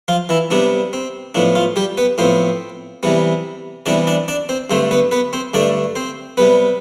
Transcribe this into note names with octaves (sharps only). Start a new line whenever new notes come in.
F3 F4
E3 E4
C3 G3 B3 D4
C4
A2 F3 B3 D4
F3 F4
G3 G4
B3 B4
A2 F3 B3 C4 C5
C3 E3 G3 B3
C3 E3 G3 B3 D4 D5
D4 D5
D4 D5
C4 C5
G2 D3 A3 C4 C5
B3 B4
B3 B4
C4 C5
G2 D3 A3 D4 D5
C4 C5
C3 G3 B3 B4